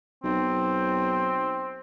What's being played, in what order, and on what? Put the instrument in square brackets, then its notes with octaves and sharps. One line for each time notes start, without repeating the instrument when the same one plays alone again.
[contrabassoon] B1 [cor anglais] C4